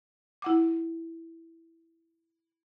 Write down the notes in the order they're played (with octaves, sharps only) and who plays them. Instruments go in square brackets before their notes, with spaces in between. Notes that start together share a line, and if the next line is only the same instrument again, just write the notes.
[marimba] E4 F#5 D6